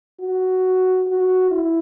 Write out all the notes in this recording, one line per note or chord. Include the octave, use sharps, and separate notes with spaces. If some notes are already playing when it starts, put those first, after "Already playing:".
F#4
F#4
E4